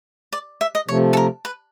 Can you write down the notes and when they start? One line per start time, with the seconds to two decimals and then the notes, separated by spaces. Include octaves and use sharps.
0.33 D5
0.61 E5
0.75 D#5
0.88 C3 F3 A3 C#5
1.13 A4
1.17 A#4
1.45 B4